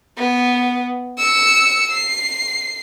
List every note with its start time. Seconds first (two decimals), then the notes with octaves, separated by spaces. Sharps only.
0.18 B3
1.19 E6 C#7
1.91 C7